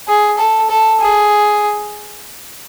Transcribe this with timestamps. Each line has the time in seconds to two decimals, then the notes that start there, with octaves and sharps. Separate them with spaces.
0.08 G#4
0.38 A4
0.70 A4
1.01 G#4